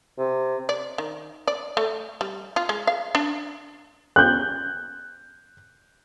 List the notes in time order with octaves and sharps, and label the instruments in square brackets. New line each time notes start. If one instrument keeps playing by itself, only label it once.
[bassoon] C3
[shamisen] D5
D#3
D5
A3
G3
F4
G#3
F5
D4
[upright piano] F#6 G6